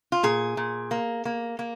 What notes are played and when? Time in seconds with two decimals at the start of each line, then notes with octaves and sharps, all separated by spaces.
0.12 F4
0.23 A#2 G#4
0.57 A#2
0.91 A#3
1.25 A#3
1.59 A#3